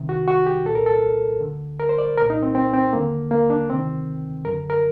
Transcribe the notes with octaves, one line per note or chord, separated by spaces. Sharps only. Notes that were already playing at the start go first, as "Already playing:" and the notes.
Already playing: C2 C3 D#3
F#4
F#4
G4
C2 A#2 A4
A#4
A4
D2 D3
A#4
C5
D5
C2 A#2 A#4
D#4
C4
C4
C4
D#2 D3 A#3
A#3
D4
D2 C3 D#3 C4
F#2 D3 A#4
A#4